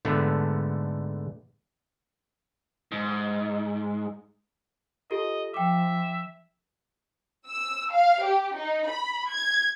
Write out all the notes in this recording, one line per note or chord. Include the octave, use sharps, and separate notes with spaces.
G#2 D3 A3 B3
G#2
F4 G4 A4 D#5
F3 E5 G5 D6
E6
F5
G4
D#4
B5
G#6